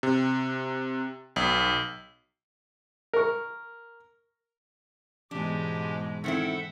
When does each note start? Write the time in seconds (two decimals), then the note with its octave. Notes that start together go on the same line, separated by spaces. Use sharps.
0.03 C3
1.36 B1
3.13 A#4 C#6
5.31 G#2 B2 E3 G#3 B3 D4 G4
6.24 D#3 C4 E4 A4 E5 F#5